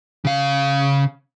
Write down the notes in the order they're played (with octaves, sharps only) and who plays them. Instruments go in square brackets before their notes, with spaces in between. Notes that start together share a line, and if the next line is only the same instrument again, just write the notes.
[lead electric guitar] C#3 F5